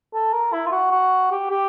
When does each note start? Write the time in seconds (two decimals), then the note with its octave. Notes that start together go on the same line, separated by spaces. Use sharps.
0.14 A4
0.34 A#4
0.53 E4
0.66 F4
0.72 F#4
0.91 F#4
1.31 G4
1.51 G4